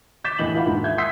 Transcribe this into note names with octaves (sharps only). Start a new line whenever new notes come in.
D6 G6 A6 B6 E7
D#2 A2 E3 D#5 F#7
E4 F4 B4 F5 F#5 B5
D#2 G#2
E5 G6 G#6
C6 D#6 E6 G6 B6 C7